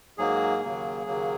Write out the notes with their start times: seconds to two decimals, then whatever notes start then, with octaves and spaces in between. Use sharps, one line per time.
0.18 G#2 F#3 A#3 G#4
0.62 D#2 C#3 F#3 A#3
1.06 D#2 C#3 F#3 A#3